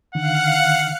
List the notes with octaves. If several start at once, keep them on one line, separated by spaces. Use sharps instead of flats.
D3 D#3 F5 F#5 F#6 C#7